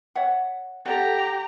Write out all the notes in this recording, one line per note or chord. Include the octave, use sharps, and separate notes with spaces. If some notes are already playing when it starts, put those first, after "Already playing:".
C#5 E5 F#5
G4 A4 D5 F#5 A#5